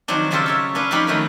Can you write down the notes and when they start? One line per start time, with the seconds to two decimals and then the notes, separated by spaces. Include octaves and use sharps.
0.08 D#3 F3 F#3 C4 D4
0.31 C#3 F#3 F4 G4 A4 C5
0.46 A4 C#5 E5
0.75 C#4 D4 B4 F5
0.91 F2 F3 D#4 G4 F#5 B5
1.07 D#3 F#3 A3 B3 D#4 A#4